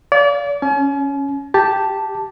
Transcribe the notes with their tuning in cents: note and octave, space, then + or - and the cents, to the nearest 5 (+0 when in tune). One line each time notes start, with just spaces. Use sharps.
D5 -35 F5 +0
C#4 +0 G#5 +40
G4 +0 A5 +0